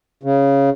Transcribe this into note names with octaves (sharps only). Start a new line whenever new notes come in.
C#3